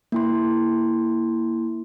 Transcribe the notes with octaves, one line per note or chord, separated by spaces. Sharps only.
A#3 E4 C6